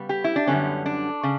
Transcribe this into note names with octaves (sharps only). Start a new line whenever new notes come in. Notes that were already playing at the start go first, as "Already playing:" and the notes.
Already playing: C#3 G3 B3
G4
E4
D4
F#2 D3 G3 B3 C#4
D4
C#3